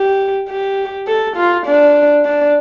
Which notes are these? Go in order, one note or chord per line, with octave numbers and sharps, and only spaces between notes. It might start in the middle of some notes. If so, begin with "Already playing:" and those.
Already playing: G4
G4
A4
F4
D4
D4